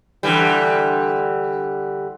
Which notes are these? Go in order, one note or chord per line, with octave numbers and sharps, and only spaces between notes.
D3 E3 G3